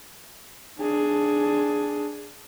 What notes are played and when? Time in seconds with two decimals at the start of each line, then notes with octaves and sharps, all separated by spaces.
0.79 D4 G#4